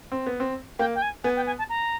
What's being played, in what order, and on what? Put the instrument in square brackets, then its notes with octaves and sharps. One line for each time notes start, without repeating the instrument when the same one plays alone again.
[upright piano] C4
B3
C4
[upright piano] A#3 [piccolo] G5
[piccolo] G5
G#5
[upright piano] B3 [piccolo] G#5
[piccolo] G5
G#5
A5
A#5